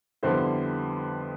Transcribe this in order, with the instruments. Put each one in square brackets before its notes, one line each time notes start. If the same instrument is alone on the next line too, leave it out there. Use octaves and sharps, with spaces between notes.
[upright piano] F2 D3 G3 B3 E4 C5